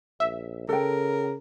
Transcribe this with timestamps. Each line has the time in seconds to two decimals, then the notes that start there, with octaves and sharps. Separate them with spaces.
0.20 A#1 E5
0.69 C#3 A4 A#4 G5